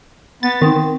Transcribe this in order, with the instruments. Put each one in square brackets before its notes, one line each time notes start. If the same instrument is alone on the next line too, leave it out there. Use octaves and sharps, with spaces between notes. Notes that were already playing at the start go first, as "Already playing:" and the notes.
[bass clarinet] B3 [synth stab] A6
[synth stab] D#3 [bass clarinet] C4